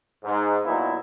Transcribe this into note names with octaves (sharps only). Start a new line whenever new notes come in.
G#2
A#2 F#3 B3 D#4 E4